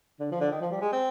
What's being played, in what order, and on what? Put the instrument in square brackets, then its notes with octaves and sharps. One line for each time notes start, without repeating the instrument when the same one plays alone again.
[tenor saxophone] D3
F3
D3
D#3
F3
G3
G#3
C4